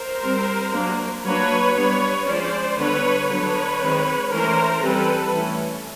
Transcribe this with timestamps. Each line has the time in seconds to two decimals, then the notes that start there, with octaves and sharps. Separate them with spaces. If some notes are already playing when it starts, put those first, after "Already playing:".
Already playing: A#4 C5
0.22 G3 C4
0.73 F#3 A#3 D4
1.23 F#3 A#3 D4 B4 C#5
1.75 G3 B3 D4 B4 C#5
2.26 F3 G#3 C#4 C5 D5
2.77 D3 G3 B3 D4 B4 C#5
3.29 D3 F#3 B3 D4 B4 C#5
3.80 D#3 G#3 C4
4.30 E3 A3 C#4 A#4 C5
4.82 E3 G3 C4 A4 B4
5.33 E3 A3 C#4